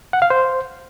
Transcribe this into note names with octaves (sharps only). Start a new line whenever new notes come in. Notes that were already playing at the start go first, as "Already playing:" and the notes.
F#5
F5
C5